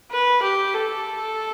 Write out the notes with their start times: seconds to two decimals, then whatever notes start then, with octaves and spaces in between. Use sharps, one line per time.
0.12 B4
0.43 G4
0.74 A4